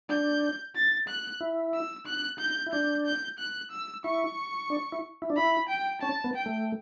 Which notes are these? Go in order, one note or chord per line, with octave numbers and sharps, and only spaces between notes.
D4 G6
A6
F#6
E4
E6
F#6
G6
E4
D4 G6
G6
F#6
E6
E4 C#6
D4
E4
E4
D4
E4 B5
G5
C#4 A5
B3
G5
A3